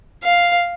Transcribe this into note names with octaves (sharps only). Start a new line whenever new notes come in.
F5